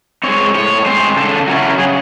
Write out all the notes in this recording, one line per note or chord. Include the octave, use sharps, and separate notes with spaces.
G#3 C4 C#5
A2 C#5
G#3 C4 C5
C#3 A4
F#3 C#4 E4 F#4
C#3 G#4